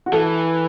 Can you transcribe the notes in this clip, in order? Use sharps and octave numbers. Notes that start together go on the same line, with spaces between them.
F#4
E3 A4